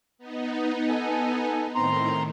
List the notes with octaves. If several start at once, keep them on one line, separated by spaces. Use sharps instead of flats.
B3 D#4
A4 G#5
A2 D#3 C4 A#5 C6